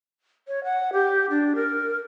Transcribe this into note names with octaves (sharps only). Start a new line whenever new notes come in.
C#5
F#5
G4
D4
A#4